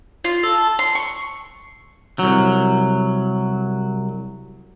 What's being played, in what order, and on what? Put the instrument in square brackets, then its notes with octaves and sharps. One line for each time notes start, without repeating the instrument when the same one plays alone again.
[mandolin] F4
A4
C6
C#6
[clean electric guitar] C2 F#3